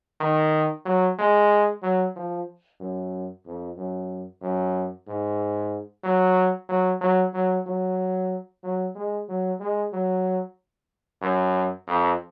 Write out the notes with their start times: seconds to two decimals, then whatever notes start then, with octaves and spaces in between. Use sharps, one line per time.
0.20 D#3
0.85 F#3
1.19 G#3
1.82 F#3
2.16 F3
2.80 F#2
3.45 F2
3.77 F#2
4.41 F#2
5.07 G#2
6.03 F#3
6.69 F#3
7.01 F#3
7.34 F#3
7.66 F#3
8.64 F#3
8.95 G#3
9.29 F#3
9.60 G#3
9.93 F#3
11.22 F#2
11.88 F2